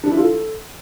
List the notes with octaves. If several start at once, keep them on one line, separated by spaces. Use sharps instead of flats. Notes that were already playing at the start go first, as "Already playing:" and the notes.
D4
E4
F4
A4